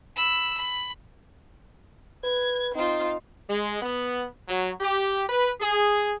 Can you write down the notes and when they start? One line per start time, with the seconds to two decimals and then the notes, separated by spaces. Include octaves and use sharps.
0.16 B5 E6
0.58 B5
2.23 B4 G#6
2.75 C4 D#4 F4
3.48 G#3
3.81 B3
4.48 F#3
4.80 G4
5.28 B4
5.60 G#4